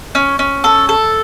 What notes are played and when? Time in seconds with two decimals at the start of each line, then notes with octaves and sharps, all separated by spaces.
0.15 C#4
0.39 C#4
0.64 A4
0.89 A4